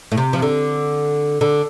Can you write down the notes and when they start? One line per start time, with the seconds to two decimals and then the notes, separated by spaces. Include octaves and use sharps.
0.12 A2
0.17 C3
0.33 F3
0.42 D3
1.41 D3